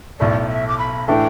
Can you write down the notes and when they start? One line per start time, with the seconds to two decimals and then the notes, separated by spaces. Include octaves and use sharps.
0.20 B1 A2 A3 D5
0.49 E5
0.68 D6
0.79 B5
1.08 A2 E3 A3 D4 G5